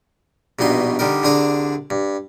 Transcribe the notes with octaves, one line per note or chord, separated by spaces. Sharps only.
A#1 G2 B2 D#4 C6
D3 G3 D#4 A#4
C2 D3 D4 G#4 A#5
G2